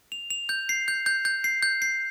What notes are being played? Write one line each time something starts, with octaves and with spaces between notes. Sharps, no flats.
F7
F7
G6
C7
G6
G6
G6
C7
G6
C7